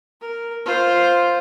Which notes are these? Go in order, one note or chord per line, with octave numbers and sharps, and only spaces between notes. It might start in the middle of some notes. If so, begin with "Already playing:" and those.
A#4
F4 C5